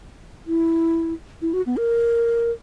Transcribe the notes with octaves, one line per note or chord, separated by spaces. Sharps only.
E4
E4
F#4
B3
A#4